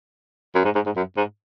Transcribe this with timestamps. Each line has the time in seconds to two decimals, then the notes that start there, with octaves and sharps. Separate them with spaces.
0.55 F#2
0.65 G#2
0.75 G#2
0.86 G#2
0.96 F#2
1.17 G#2